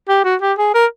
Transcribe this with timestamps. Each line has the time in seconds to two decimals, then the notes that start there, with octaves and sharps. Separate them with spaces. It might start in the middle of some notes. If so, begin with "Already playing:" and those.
0.09 G4
0.24 F#4
0.41 G4
0.58 G#4
0.74 A#4